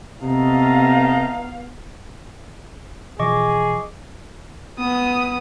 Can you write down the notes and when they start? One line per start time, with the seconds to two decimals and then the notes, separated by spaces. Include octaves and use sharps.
0.23 C3 A3 B3 D#5 F5 A#5
3.19 B2 E3 F3 G#4 D#5 C#6 D6
4.78 B3 D#6